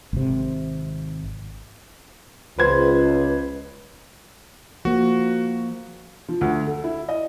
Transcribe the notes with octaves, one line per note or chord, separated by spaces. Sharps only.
G#1 C3
C#2 B4 C5 G#6
F3 A#3 F#4
F3
D2
A4
E4
D#5